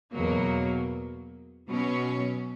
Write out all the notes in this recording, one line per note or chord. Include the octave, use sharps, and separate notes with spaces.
E2 B2 F#3 A#3
B2 F#3 C#4